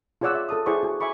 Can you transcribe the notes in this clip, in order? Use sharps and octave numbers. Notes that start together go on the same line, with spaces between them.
F4 G#4 C#5 D5 F#5 E6
E5
A4 A5 D#6
E4 G#4 C5 D5 F#5 C#6
F#4
E5 G#5 B5 C#6 D6